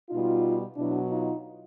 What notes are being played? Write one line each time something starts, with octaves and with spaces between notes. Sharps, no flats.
B2 G3 D#4 F4
B2 F#3 D4 E4
D#4 F4